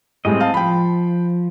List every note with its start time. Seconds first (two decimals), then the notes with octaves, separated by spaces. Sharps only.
0.25 A2 G3 G#3 C4 D#5
0.40 F5 A5
0.54 F3 G5 B5